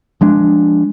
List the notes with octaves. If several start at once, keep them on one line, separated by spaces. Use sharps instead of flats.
F3 G#3 D4